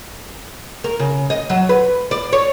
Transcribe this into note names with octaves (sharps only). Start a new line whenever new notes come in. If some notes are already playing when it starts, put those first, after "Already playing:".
A#4
C#3
D#5
F#3
B4
D5
C#5